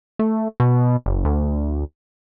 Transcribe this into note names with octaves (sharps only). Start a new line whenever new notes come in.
A3
B2
F#1
D2